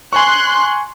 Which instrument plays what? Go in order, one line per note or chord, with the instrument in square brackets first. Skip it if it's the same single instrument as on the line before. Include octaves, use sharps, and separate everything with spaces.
[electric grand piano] G#5 C#6 [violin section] C6 F#6